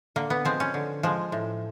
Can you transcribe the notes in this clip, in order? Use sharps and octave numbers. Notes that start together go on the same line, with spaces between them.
D3 A#3
B3
F3 G#3 C4
C#4
D3
F3 G#3
A2